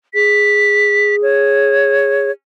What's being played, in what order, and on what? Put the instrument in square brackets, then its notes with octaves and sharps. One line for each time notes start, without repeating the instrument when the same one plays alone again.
[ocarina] G#4 [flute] B6
[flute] C#5